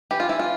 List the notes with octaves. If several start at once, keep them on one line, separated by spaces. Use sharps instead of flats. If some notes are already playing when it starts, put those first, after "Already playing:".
E3 G4
F4
E3 E4
F4